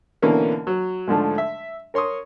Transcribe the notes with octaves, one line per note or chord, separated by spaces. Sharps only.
B2 D3 E3 A#3 C#4
F#3
G#2 D3 F3 A3
E5
A#4 C#5 C6 C#6 D#6